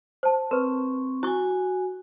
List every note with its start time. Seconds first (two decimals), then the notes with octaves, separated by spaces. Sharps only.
0.23 C5 A5
0.51 C4 A#4 B4 C#6
1.23 E4 F#4 G#5 C#6